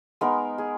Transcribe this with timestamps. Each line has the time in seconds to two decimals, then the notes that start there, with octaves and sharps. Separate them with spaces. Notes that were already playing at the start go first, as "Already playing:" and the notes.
0.21 G#3 B3 D#4 A#4
0.58 G#4